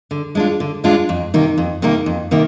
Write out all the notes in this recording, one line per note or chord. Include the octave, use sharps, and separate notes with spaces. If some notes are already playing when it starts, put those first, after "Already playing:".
D3
G#3 D4 F4
D3
G#3 D4 F4
F2
C3 D#3 A#3 D#4
F2
C3 D#3 A#3 D#4
F2
C3 D#3 A#3